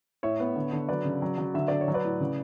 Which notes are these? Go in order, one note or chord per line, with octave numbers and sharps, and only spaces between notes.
A2 C#5 E5
B3
D3
D3
F#3 B4 D5
C#3
F#3
F#3
D3 E5
D3 D5
C#5
F#3
B4 D5
A2
C#3